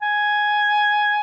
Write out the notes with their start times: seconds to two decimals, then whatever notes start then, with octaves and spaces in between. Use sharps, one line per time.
0.02 G#5